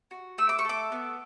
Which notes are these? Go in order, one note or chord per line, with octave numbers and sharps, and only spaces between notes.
F#4
A3 E6
D6
C#6
A4 D6
B3